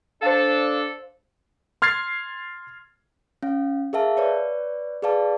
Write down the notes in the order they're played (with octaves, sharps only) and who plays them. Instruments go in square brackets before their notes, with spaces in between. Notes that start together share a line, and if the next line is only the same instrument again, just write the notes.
[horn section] D4 A4 [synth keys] C5 F5
[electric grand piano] C6 F6 G#6 A6 C7
[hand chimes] C#4 F5
G#4 A#4 E5 F5 A5
B4 C#5 D5
G#4 B4 D5 F5 A5